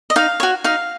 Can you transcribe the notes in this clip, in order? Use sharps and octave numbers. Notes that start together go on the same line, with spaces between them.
D#5
D#4 F5
F#4 C#5
D#4 F5